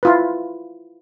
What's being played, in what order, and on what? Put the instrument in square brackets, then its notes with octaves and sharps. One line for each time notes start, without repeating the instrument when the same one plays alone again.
[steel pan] E4 F4 B4